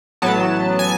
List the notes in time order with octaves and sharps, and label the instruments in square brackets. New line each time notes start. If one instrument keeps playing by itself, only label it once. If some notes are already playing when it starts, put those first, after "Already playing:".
[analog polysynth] A1 A2 F#3 B3 A5
G#5